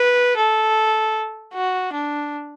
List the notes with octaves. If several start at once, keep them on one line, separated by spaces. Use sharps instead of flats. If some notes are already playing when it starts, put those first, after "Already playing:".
Already playing: B4
A4
F#4
D4